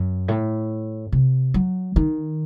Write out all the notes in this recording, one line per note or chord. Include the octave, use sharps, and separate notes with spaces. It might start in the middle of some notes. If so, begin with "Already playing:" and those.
Already playing: F#2
A2
C3
F#3
D#3